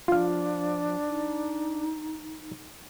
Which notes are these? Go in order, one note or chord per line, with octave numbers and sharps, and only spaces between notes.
F3 D4 F4 F5
D#4